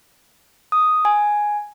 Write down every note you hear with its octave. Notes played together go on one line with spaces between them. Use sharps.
D#6
G#5